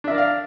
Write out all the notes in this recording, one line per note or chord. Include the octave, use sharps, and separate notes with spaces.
D4 A#4 D5 E5 F5